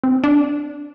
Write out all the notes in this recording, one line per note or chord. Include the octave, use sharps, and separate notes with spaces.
C4
D4